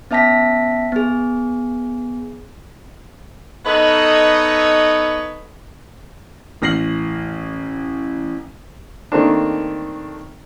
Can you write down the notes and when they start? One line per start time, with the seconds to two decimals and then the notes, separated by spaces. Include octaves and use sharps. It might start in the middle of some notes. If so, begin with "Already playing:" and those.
0.11 B3 C#4 E5 A5 A#6 B6
0.92 B3 G#4
3.65 B3 D#4 A4 B4 C#5 D#5
6.62 A1 F6 A#6 C7 F#7
9.12 D#3 A3 A#3 C4 D4